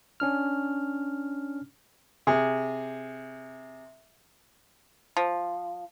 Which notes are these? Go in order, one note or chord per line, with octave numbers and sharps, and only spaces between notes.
C#4 D4 F6
C3 G#4
F3